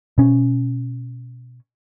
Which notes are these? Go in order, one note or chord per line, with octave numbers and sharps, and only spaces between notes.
B2 C#4